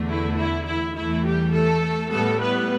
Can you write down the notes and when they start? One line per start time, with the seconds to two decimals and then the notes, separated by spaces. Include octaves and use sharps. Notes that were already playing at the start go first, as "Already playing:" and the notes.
Already playing: E2 D3 A3
0.08 E4
0.37 E4
0.66 E4
0.95 E2 E3 A3 E4
1.24 G3 G4
1.53 A3 A4
2.11 A2 G3 A3 B3 A4
2.40 B3 B4